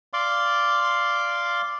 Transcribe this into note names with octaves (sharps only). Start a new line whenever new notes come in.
D5 F5 C6 D6